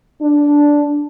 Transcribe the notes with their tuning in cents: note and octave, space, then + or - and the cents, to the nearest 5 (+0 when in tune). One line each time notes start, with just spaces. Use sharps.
D4 -5